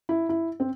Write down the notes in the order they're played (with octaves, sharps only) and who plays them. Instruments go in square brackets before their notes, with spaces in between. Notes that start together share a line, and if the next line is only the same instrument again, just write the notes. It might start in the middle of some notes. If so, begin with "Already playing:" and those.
[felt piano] E4
E4
C4